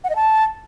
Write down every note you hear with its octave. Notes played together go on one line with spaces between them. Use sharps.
F#5
D#5
A5